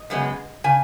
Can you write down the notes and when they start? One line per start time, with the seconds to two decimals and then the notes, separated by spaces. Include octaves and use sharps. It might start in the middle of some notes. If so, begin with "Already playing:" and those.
Already playing: D#5
0.10 F#2 C#3 G#3 B3
0.64 C#3 G#5